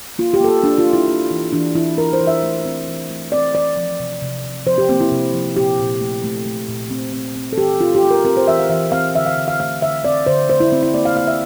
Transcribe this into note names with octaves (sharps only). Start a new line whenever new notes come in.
A#3 F4
G4
A#3 A4
G4
A#3 D4
F4
A#3
E4
A#3
E3
E3 D4
E3 E4
E3 A#4
C5
E3
E5
A3
C4
E3
A3
C4 D5
E3 D5
F3
C3
C3
C3
F3 C5
G4
A#3 C4
E4
C3
F3
A#2 G4
A#2
A3
A3
A3
A#2
C4
C4
C4
A4
E3 G4
C4 F4
G4
A3
A#4
C4 A#4
C5
E3 E5
F5
E3 E5
C4 F5
D3 E5
F5
D3
F5
A3 F5
D3 E5
C4 D5
D3 C5
A3 C5
E4
C4
E4
A#3 D5
F5
A#3 F5
E5